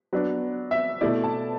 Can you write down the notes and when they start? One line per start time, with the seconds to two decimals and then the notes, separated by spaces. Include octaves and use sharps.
0.13 F#3 B3 D4
0.71 E5
1.01 B2 A3 E4 D5
1.24 A5